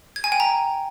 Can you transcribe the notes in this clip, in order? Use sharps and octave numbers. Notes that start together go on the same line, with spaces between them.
G#6
G#5
G5
A#5